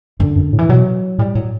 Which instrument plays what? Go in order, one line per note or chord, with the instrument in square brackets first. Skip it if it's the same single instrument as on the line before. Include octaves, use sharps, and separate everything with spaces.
[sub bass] F#2 [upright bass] D3
[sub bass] F#2
A2
[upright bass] E3
[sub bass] B2 [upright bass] F#3
[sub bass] A2 [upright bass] G3
[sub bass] A2 [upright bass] F#3